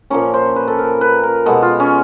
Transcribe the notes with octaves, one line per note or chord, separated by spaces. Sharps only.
A#2 F3 A#3 C#4 C#5
C5
B4
A4
A#4
B4
A#4
B2 G#3 B3 A4
F4
C#4